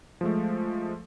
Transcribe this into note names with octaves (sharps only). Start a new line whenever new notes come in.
F3 G#3 A3